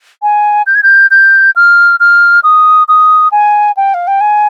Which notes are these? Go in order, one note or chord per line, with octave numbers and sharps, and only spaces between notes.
G#5
G6
G#6
G6
G6
F6
F6
D#6
D#6
G#5
G5
F5
G5
G#5